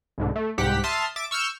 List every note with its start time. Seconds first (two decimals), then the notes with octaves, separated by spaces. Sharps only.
0.18 C2 G#2 D3
0.36 A3
0.58 C2 G#2 G4 F#5 B6
0.84 E5 A5 C6 D#6 F6 C7
1.16 E5 D6 A6
1.31 C#6 E6 F6 G6